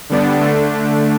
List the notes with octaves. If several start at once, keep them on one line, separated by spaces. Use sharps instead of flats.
D3 G3 B3 D4
D3 A3 D4